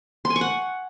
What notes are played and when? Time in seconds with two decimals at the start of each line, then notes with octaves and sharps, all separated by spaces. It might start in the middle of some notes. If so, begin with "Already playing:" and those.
0.25 C6
0.30 G#5
0.36 C#6
0.41 F#5